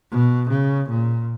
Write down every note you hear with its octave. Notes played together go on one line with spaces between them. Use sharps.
B2
C#3
A#2